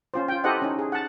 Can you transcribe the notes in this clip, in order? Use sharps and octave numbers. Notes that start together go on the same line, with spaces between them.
C#4 F4 C5
F4 G5
E4 G4 A4 C5 D#5 F#5
C#4 D#4
G#4
F#5 A5